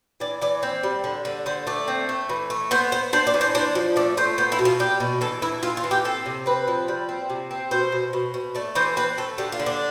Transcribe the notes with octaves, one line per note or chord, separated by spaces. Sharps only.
E3 D5
E3 D5
C4
G3
D3
D3
D3 C5
A3 D5
C4
A3
E3
A3
B3 C5
B3 C5
D4 C5
D5
E3
C5
D4 C5
F3
A3 D5
A3 C5
B3 C5
E4
B2
F4
G3 G4
B2
E3 A4
E3 E4
E3 F4
F4
E3
G4
C4 A4
C3
C4 B4
F3
G3
C4
C3
C4
B2 C5
B2
B2
B2
A3 D5
E3 C5
C4 B4
A3 A4
D3 G4
F4
D3
D4